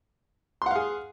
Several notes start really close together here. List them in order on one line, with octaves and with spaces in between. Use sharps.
C6 F#5 F5 G#4